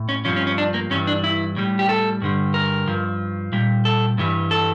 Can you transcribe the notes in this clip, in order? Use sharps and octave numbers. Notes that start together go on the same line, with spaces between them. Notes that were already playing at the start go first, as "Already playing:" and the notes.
Already playing: A2
C#4
G2 F3 C#4
C#4
C#4
D4
A#3
G2 E3 G3 C#4
D4
E4
A2 G3
G4
A4
G2 D3 G3
A#4
G2 F3
A#2 G3
A4
G2 E3 G3
A4